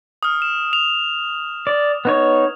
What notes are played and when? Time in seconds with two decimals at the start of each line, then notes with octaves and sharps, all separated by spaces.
0.23 D#6 F6
0.42 E7
0.73 F7
1.67 D5
2.05 B3 D#4 C#5